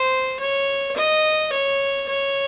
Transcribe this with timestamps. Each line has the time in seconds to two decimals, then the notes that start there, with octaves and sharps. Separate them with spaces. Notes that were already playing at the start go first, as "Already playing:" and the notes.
Already playing: C5
0.39 C#5
0.97 D#5
1.52 C#5
2.09 C#5